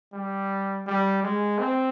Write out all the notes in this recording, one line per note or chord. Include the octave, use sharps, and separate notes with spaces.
G3
G3
G#3
C4